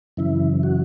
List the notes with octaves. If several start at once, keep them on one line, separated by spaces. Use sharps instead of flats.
F#2 C#3 E3 E4
F#4